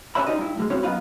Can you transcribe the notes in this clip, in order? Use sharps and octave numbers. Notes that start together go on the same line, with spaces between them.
C#4 G4 B4 C#5 E5 B5
D#4 F4 G4 D5 D#5
G2 E4
A2 G3 G#3
C4 C#4 E4 F#4 G4 C#5
F#2 B3 F4 D#5 F5 B5